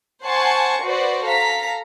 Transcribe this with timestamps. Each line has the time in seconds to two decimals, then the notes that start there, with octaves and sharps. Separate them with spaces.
0.24 C5 F#5 G#5 A5 C6 C#6
0.83 F#4 B4 C5 D5
1.24 A4 F5 A#5 B6